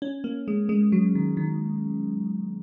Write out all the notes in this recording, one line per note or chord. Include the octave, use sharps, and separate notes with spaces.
C#4
A#3
G#3
G#3
F#3
D#3
D#3